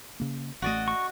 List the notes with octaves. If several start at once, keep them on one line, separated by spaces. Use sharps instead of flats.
C#3 A#3
A1 A3 F#4 D5 D#5
C#6